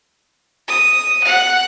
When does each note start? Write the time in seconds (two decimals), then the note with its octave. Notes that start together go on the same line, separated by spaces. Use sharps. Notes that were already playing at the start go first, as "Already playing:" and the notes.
0.68 D#6
1.24 F#5